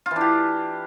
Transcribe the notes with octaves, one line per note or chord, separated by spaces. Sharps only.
E3 D4 F4 G4